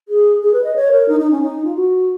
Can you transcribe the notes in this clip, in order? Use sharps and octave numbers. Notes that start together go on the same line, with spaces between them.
G#4
G#4
B4
D#5
C#5
A#4
D#4
D#4
C#4
D#4
F4
F#4